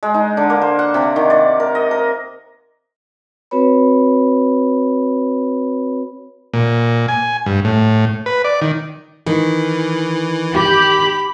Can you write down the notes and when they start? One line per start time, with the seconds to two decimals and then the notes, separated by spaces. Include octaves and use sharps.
0.03 G#3
0.14 D#4
0.37 D3
0.50 A#3
0.62 C5
0.79 F#5
0.94 C3
1.16 D#3
1.30 D5
1.60 A#4
1.75 D#5
1.91 A#4
3.51 C4 F#4 B4 C#5 B5
6.54 A#2
7.08 G#5
7.46 G2
7.65 A2
8.26 B4
8.45 D5
8.62 D#3
9.27 D#3 E3
10.55 G4 B5